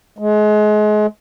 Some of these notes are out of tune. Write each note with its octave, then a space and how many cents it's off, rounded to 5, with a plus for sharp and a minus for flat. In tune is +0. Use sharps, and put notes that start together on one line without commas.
G#3 +30